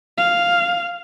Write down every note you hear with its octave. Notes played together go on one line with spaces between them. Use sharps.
F5